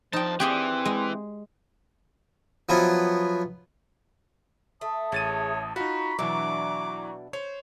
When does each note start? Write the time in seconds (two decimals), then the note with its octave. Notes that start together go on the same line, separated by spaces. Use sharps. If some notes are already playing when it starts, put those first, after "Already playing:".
0.13 F2 F3 D#4 G5 A5
0.40 E3 C4 G4 G#4 D5
0.85 G#3
2.69 F3 F#3 B3 E4 F4
4.81 A3 E5 A5 D#6
5.12 A1 G#4 C#5 A6 D#7
5.76 D#4 F4 F#4 A#5 B5 C#6
6.19 B2 E3 F#3 D4 E5 D6
7.33 C5 C#5